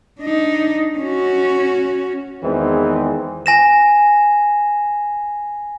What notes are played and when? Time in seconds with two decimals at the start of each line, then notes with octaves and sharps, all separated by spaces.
0.21 D4 D#4
0.99 C#4 F#4
2.43 E2 D#3 E3 G#3 C4
3.46 G#5 A#6 E7